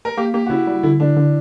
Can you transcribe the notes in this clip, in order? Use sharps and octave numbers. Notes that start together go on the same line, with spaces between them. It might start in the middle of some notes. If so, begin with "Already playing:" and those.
A#4
A#3 G4
A#3 G4
F#4
C#3 E4
G3
D3 E4
D3 D4
D3